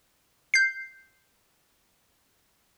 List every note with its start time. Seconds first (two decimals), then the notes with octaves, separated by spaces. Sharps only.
0.54 G6 C7